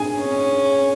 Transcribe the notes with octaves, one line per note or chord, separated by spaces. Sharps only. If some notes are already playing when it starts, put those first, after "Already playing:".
Already playing: G#4 G#5
C#4